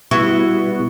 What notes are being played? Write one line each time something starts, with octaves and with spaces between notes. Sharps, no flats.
B2 G3 B3 E4 F#4 C#6